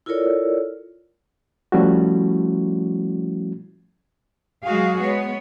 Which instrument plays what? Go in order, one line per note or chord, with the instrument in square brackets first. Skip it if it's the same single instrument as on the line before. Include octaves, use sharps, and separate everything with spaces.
[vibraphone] E4 F4 A4 A#4 C#5 D5
[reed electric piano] F3 G3 A3 C#4 E4 F#4
[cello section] F#3 G#3 F#4 G#4 F5
G#3 B3 C#5